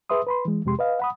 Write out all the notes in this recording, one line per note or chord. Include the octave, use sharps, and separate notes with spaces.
G#4 B4 E5 C6 D#6
B4 B5 C6
E3 G#3
F2 C3 G#3 G4 C6
B4 D#5 F5
F#5 B5 D#6